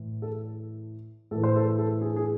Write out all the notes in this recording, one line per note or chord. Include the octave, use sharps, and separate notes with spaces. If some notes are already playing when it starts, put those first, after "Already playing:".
Already playing: A2 E3
A4
A2 E3 A4
C5
A4
A4
G#4
G#4